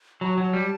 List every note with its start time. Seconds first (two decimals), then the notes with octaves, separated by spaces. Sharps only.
0.21 F#3 B5
0.25 A5
0.38 F#3
0.53 G3